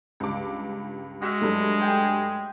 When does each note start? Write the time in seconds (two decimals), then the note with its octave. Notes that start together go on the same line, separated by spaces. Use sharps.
0.20 C#2 G2 D6
1.22 G#3 F#4 E5
1.41 G2 F#3 A3
1.81 G5 G#5